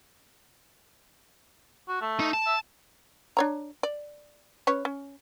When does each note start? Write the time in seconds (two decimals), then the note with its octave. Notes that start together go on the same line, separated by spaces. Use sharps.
1.88 F#4
2.01 A3
2.20 D#4
2.34 A5
2.46 E5
3.37 D4 C#5 A#5
3.83 D5
4.67 C#4 B4 C#5
4.85 C#4